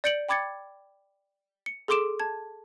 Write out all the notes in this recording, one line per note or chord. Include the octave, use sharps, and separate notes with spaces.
D5 G6 C#7 D7 F#7
G5 B5 D6 G#6 A6 C#7
C#7
G#4 A4 C6 D6 D7 E7
A5 G#6